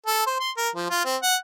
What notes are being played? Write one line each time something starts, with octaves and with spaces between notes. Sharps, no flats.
A4
C5
C6
A#4
F3
F4
C4
F#5